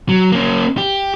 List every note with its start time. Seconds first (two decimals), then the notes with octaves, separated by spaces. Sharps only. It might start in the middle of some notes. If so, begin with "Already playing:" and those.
0.09 F#3
0.32 A#3 C#4
0.78 G4